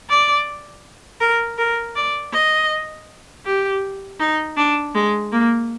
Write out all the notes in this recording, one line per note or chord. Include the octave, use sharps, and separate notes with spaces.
D5
A#4
A#4
D5
D#5
G4
D#4
D4
G#3
A#3